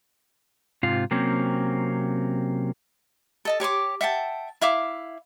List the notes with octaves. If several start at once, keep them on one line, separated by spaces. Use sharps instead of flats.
G#2 C3 F4
C3 F#3 A#3 C4 C#4
A4 D#5 A5
G4 C#5 C6 D6
E5 F#5 G5 A5
E4 E5 F5 D6